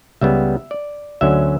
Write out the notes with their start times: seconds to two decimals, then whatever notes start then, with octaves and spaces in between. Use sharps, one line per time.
0.21 C#2 C#3 G3 B3 E5
0.71 D5
1.21 D2 D3 F#3 C#4 E5